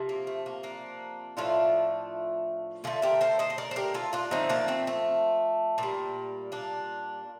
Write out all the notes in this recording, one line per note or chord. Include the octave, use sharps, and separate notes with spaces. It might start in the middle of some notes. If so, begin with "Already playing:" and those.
Already playing: C3 F3
A#3
A3
A#3
A#3 D4
A2 F3 A3 D4 F4
D3 A3 F4 A4
G4 A#4
A4 C5
C5 D#5
D#5
A#4 D5
C5
G4 A#4
F4 A4
D4 F4
D3 F3 A3 C4 D#4
A#3 D4
A3 C4
A3
A#2 G3 A#3
A#3 D4